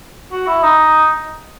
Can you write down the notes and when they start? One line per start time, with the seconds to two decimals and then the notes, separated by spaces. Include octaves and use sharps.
0.32 F#4
0.47 E4
0.63 D#4